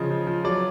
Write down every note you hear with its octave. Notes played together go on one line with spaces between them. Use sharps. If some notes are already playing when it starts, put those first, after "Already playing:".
Already playing: C#3 F3 D#5
F3
F3
F#3 D5